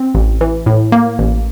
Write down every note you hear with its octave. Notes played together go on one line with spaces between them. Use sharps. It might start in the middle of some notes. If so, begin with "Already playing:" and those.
Already playing: C4
A1
E3
A2
A#3
A1